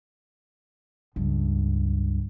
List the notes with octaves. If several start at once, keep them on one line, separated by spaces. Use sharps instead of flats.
C#2 G2